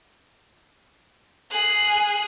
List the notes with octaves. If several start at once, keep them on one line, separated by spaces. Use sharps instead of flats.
G#4 F#6